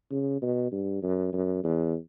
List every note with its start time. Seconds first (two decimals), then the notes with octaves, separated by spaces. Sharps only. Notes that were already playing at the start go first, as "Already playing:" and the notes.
0.11 C#3
0.42 B2
0.72 G2
1.03 F#2
1.33 F#2
1.64 E2